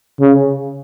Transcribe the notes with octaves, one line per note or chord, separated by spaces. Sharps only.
C#3